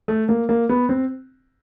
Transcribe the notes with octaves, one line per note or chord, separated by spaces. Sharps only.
A3
A#3
A#3
B3
C4